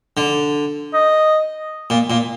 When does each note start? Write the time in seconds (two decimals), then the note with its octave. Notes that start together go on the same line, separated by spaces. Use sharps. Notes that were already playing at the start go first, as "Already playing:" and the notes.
0.17 D3
0.94 D#5
1.90 A#2
2.10 A#2